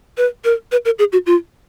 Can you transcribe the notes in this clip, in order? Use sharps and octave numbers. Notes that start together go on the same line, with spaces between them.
B4
A#4
B4
A#4
G#4
F#4
F4